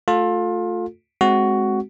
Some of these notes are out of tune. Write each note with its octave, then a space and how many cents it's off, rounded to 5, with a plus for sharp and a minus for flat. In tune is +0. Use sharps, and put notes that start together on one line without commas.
A3 +0 F4 +25 A4 +0
G#3 +15 C4 +0 F#4 +10